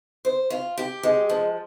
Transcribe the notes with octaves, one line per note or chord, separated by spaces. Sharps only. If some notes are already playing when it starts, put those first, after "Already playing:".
C5
F4
G4
G#3
F3